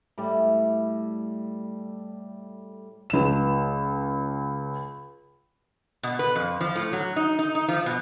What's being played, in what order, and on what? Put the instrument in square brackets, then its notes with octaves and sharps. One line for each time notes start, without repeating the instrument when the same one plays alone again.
[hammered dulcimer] A2 G3
[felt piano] C#2 E7
[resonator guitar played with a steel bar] B2
B4
F2
F3
A2
F#3
D#4
D#4
D#4
F3
B2